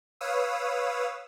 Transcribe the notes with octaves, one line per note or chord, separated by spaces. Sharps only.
B4 C#5 F5 D#6 E6